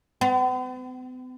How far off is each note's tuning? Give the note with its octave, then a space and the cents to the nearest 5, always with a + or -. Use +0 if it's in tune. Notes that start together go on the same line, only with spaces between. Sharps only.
B3 +45